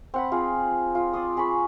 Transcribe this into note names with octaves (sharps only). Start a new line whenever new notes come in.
C4 F#5 B5
C4 F4 G#4
F4
D5 C6 D#6
G#4 B5 C#6